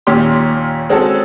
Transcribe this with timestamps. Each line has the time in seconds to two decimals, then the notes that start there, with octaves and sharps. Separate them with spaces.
0.07 D#2 A#2 C#4 G4 C6
0.90 G#3 C4 C#4 F#4 A4